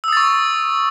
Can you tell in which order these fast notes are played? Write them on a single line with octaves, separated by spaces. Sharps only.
E6 D#6 A6 C#6